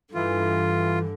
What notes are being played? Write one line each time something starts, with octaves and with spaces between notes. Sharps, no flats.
G2 D3 E3 F4